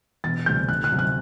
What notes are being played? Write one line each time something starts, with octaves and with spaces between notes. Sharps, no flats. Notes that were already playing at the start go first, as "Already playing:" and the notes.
E1 A6
D2 C3 G3 G6
D2 F#6
F#6
C3 F#3
F#6